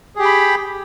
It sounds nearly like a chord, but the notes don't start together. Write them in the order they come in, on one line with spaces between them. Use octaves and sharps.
G#4 G4 G5 B5